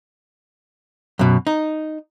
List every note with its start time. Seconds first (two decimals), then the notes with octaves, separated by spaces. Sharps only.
1.19 F#2 B2
1.47 D#4